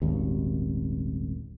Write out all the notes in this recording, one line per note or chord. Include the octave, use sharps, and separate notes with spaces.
D#1 G#1 D#2